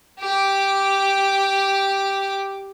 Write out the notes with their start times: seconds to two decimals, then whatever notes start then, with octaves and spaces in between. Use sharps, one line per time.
0.19 G4 D6